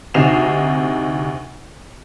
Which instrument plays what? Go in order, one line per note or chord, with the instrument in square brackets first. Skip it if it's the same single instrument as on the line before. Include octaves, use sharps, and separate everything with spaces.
[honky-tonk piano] D2 C3 D#4 C7 E7 F7